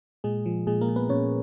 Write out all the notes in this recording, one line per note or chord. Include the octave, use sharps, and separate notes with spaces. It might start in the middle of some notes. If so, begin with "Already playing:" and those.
A#2 G#3 G#4
F3
A#2 G#3 G#4
A#3 A#4
A#2
B3 B4
A#2 C#4 C#5